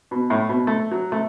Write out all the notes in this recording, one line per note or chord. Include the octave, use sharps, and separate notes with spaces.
B2
A2
B2
A3
F#3
A3